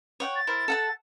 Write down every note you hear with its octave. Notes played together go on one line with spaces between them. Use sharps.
C#5 F#5 G5
A6
E4 A#4 C5
A4 F#5 A5